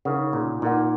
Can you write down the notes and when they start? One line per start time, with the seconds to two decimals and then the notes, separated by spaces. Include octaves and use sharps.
0.05 C#3 D#4 A#4 F#5
0.33 A#2
0.62 A#2 D#4 A#4 F#5